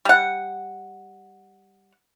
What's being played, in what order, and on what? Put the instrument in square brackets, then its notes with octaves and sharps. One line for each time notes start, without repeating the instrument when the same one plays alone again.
[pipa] G3 F#5